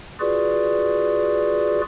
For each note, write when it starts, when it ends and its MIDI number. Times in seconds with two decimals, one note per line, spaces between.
0.20 1.81 65
0.20 1.81 66
0.20 1.81 68
0.20 1.81 71
0.20 1.81 74